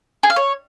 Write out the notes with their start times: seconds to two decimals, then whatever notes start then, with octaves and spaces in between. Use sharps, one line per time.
0.23 G#4
0.30 F5
0.36 C#5